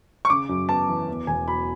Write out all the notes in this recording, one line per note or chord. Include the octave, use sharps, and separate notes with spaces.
C#6
C#3 D6
F#2
B3 A5
E3
E2
E1 G#5
F#3 B5